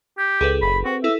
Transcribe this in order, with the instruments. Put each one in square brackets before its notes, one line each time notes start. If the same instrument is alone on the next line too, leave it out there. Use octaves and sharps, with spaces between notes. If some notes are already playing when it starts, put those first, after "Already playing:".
[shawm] G4 [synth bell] G6
[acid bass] C#2 [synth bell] G#4 A4 B4
[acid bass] F#1 [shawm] B5
[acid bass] C4 [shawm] F#4
[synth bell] E4 A4 [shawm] E5